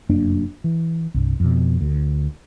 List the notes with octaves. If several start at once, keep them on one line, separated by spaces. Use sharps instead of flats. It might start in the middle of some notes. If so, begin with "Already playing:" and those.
F1 F#2 A#3 D4
E3
C2 G2
F2 B2
D2